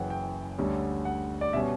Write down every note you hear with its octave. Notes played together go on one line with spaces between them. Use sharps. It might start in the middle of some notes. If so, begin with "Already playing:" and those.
Already playing: F#1 F#2 E3 F#5 G5
G5
D2 D3 G3 C#4
F#5
D5
B2 G3 C#4 E5